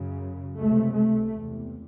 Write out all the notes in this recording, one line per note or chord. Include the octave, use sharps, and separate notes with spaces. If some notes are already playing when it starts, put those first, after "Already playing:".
Already playing: F#2 C#3
C#2 C3 A3
A3
E2 C3